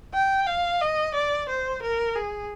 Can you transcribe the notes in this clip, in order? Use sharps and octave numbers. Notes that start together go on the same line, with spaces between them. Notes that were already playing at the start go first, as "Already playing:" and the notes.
G5
F5
D#5
D5
C5
A#4
G#4